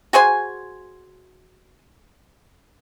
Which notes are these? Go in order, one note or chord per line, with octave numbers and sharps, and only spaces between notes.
F#4 G#4 C5 G#5